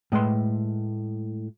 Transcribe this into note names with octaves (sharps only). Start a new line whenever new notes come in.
A2 G#3 B4 C6